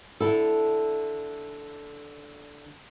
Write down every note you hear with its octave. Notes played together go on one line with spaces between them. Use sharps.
D3 E4 A4